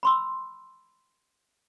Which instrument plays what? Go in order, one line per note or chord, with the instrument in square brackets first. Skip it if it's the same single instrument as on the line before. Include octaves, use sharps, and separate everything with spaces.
[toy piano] B5 C6 E6